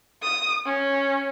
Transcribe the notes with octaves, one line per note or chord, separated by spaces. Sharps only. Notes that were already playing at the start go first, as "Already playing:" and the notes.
D#6
C#4